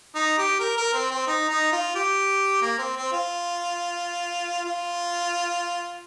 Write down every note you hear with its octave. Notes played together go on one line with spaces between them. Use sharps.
D#4
G4
A#4
A#4
C4
C4
D#4
D#4
F4
G4
A#3
C4
C4
F4
F4